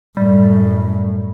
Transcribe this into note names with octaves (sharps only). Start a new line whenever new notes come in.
F#2 A2 G3